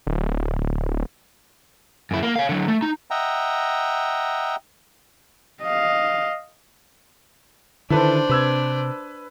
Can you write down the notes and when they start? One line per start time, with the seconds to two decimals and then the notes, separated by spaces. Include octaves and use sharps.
0.07 D1
2.11 F#2 E4
2.23 A#3
2.36 C#5 F5
2.49 D3 F#3
2.68 A3
2.82 D#4
3.11 D#5 E5 F#5 G5 A#5
5.62 D#5 F5
7.90 D3 D#3 D4 E4 A4 B4 C5
8.29 C3 B4 E6 G#6